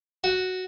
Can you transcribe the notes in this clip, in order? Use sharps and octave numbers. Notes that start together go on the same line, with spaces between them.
F#4